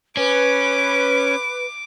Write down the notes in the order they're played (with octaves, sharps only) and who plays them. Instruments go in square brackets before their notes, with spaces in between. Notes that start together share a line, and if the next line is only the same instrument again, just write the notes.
[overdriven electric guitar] C#4 [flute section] B4 [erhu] D6